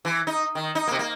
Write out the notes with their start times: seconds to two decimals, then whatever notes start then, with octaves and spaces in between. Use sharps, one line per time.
0.05 E3
0.27 D#4
0.55 D#3
0.75 D#4
0.87 C3 A#3
0.99 A#3